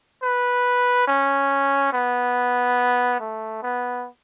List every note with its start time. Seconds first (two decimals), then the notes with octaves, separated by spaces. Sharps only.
0.22 B4
1.07 C#4
1.92 B3
3.20 A3
3.62 B3